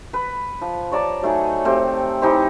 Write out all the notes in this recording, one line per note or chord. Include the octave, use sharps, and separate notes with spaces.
B4
F3
C#5 D5 A5 A#5
F#3 A3 D#4 G#4
A3 C4 G4
E3 D#4 G4 C5